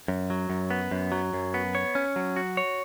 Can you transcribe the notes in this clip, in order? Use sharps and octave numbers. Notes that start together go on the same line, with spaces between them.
F#2
F#3
F#2
B3
F#2
F#3
F#2
B3
C#5
C#4
F#3
F#4
C#5